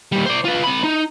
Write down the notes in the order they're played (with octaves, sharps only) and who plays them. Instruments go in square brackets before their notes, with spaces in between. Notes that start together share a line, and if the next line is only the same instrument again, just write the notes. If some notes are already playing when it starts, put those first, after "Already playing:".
[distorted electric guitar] D#2 G3
C5 D5
F4 B4
C4 B5
D#4